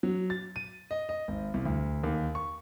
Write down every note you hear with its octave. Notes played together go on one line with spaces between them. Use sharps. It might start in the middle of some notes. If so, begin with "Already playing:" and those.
F#3
A6
D#7
D#5
D#5
G#1
C2
D2
D#2
C#6